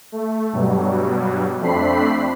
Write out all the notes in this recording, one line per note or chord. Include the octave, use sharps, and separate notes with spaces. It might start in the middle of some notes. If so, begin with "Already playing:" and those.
A3
G2 B2 F#3 G3
F2 A3 C4 D4 B5 C7